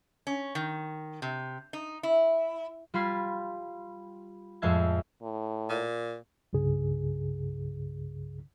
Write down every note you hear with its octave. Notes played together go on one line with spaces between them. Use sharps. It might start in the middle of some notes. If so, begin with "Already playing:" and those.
C#4
D#3
C3
D#4
E4
G3 F4 B5 C6 G#6 A6
F2 A2 G#3 E5 A5 G#6
A2
A#2
C2 G2 C#3 G#4